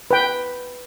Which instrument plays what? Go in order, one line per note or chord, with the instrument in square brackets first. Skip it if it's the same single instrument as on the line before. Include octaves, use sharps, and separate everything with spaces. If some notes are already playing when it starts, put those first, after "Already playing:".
[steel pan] B4 G5